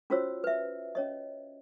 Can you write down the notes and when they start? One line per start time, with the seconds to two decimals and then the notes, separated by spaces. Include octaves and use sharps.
0.10 C#4 F4 F#4 C5 C#5 E6
0.44 B4 E5
0.95 C#4 C#5 D#5